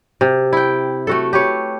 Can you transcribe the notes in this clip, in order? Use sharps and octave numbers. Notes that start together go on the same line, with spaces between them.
C3
E4 G5
A3 F#4 A4
G4 B4 C#5